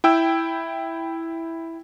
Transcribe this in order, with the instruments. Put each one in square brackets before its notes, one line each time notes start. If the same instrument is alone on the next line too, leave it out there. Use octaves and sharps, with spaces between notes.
[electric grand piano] E4 G5 E6